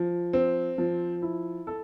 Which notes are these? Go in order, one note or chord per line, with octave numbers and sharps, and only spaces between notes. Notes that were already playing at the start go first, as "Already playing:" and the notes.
Already playing: F3
C4
F3
E4
A4